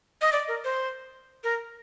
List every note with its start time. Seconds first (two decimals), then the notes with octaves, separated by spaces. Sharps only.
0.22 D#5
0.32 D5
0.48 A#4
0.64 C5
1.44 A#4